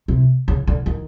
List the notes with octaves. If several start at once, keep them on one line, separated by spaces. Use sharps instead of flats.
C3
C#3
D3
D#3